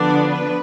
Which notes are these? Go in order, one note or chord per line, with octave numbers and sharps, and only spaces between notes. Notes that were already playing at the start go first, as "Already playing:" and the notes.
Already playing: D3 F3 B3 D4 D5
B4